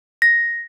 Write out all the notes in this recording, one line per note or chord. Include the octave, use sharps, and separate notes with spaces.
A#6